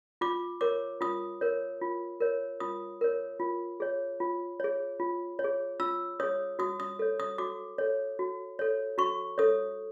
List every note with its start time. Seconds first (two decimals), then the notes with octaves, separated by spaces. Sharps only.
0.21 F4 D6
0.61 A#4 C#5 D6
1.01 F4 D#6
1.41 A#4 C#5
1.81 F4
2.20 A#4 C#5
2.60 F4 D#6
3.01 A#4 C#5
3.40 F4
3.80 G#4 C#5
4.20 F4
4.60 G#4 C#5
5.00 F4
5.39 C#5
5.44 G#4
5.80 F4 E6
6.20 G#4 C#5 D#6
6.59 F#4 D#6
6.80 D#6
6.99 A4 C#5
7.20 D#6
7.38 F#4 D6
7.78 A4 C#5
8.19 F#4
8.59 A4 C#5
8.98 F#4 C#6
9.38 A4 C#5 D#6